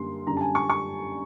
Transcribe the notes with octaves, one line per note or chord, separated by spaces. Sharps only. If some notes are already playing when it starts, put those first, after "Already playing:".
Already playing: F#2 D3 G3 A#3 C6
F#2 D3 G3 A#5
A5
G#5
C#6
C#6